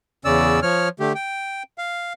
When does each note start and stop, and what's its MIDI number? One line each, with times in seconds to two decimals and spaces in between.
0.25 0.60 40
0.25 0.60 49
0.25 0.60 61
0.25 0.60 74
0.25 0.60 88
0.62 0.89 53
0.62 0.89 73
0.62 0.89 89
1.00 1.13 50
1.00 1.13 57
1.00 1.13 67
1.15 1.63 79
1.78 2.13 77